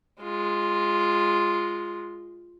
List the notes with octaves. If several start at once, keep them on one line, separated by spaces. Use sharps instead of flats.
G#3 F4